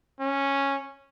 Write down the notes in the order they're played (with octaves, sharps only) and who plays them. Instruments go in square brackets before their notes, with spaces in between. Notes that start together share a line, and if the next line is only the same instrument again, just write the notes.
[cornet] C#4